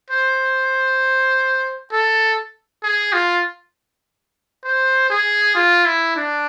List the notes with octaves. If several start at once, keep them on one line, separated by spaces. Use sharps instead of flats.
C5
A4
G#4
F4
C5
G#4
F4
E4
D4